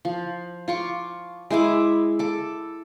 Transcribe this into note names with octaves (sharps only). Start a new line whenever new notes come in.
F3
F4 C#6 D6
G#3 E4 E5 D6
A4 D6